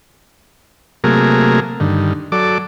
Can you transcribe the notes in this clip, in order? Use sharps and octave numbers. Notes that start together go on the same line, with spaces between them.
C3 F#3 A3 A#3 G#4 A#4
G2 D3 D#3
F#3 A4 D5 D6